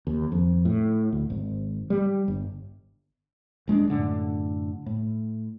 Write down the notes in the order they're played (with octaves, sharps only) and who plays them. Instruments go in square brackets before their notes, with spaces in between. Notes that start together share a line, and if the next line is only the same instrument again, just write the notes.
[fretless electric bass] D#2
F2
A2
D2
G#1
G3
G1
D#1 G#3 C#4 D4
F#2 A2 D3
A2